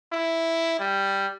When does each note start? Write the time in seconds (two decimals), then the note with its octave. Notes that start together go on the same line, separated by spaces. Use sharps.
0.12 E4
0.79 G3